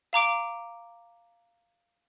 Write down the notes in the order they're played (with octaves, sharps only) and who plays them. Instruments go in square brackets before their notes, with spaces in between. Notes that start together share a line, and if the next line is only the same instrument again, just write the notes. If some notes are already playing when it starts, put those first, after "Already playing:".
[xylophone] F5 A#5 D6 D7